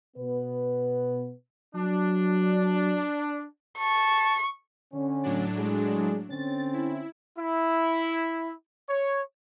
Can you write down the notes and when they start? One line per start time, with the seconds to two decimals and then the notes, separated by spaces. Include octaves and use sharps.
0.17 B2 B3 B4
1.75 F#3 D4
3.78 A5 C#6
4.93 D3 C#4
5.23 A2 F#3 D4
5.58 G#3 G#4
6.30 D3 C4 C#4 A6
6.73 E4
7.36 E4
8.88 C#5